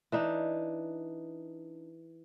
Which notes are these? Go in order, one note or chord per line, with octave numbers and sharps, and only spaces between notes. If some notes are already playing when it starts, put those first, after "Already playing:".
E3 D4 D#4